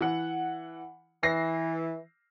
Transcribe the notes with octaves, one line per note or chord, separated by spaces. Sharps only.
E3 F#5
E3 A#6 C7